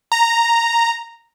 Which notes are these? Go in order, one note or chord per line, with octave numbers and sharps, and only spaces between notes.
A#5